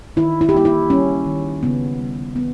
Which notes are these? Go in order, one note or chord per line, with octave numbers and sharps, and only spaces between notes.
D#3 E4
E4
G4
A#3 E4
E4
G3 C#4
D#3
C#3 B3
G3
E3 B3